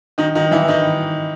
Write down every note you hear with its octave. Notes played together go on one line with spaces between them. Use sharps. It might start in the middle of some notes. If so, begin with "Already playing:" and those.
D#3 D#4
D#3 D#4
E3 E4
D#3 D#4